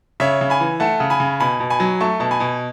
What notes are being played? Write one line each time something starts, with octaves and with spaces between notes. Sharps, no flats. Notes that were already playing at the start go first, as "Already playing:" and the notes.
C#3 C#5 E5
C#3
G#5 B5
E3
A3 F#5 A5
C#3
G#5 B5
C#3
B2 G#5 B5
B2
G#5 B5
F#3
A3 A5 C#6
B2 A5
G#5 B5
B2